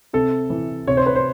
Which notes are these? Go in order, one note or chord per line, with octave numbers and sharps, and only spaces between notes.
C3 A4
E3
C3 C#5
C5
B4
C5